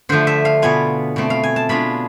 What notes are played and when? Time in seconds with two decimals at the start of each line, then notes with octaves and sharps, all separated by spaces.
0.09 D3 F3 A3 C5
0.27 E5
0.45 F5
0.62 B2 B3 F4 G#5
1.16 B2 A3 C4
1.30 F5
1.43 G#5
1.56 A5
1.69 B2 G#3 D4 F4 B5